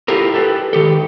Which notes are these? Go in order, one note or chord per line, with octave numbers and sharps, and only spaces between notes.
E4 F4 G4 A4 A#4
G4 A4 B4 G5
D#3 G4 A4